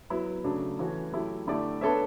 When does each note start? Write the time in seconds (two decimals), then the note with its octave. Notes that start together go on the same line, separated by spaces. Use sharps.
0.10 F#3 B3 E4
0.44 C#3 F#3 A3 D4
0.79 E3 A3 C#4 F#4 C#5
1.12 F#3 A3 E4 G4
1.47 D3 A3 E4 G4 D5
1.81 B3 D4 A4 C#5 E5